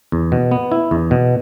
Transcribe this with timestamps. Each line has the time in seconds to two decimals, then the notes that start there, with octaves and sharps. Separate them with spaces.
0.12 E2
0.32 B2
0.51 B3
0.72 E4
0.91 E2
1.11 B2